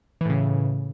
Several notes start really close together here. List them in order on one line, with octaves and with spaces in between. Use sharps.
E3 A2 C#3